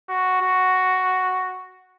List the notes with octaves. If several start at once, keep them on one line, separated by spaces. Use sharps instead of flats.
F#4
F#4